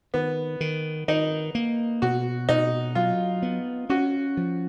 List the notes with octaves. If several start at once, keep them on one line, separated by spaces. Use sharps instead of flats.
D#3 B3
D#3
D#3 D#4
A#3
B2 F#4
B2 D#4
F#3 F4
B3
C#4 F#4
F3